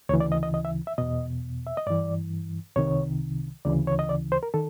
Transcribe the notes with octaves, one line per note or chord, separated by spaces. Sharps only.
D2 C#3 E3 C#5
D5
D#5
D#5
D#5
E5
E5
E2 B2 D#5
E5
D#5
G2 E3 D5
C2 C3 D#3 C#5
D2 C#3 E3 D5
C#5
D#5
D5
C5
A#4
D#3 A4